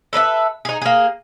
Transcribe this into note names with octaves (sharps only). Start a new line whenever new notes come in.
A4 B4 D5 E5
D#4 G#4
A#3 G#4